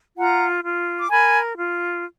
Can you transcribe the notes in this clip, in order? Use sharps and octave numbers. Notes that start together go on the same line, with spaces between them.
F4 F#5 A#5
F4
D6
A#4 G#5 B5
F4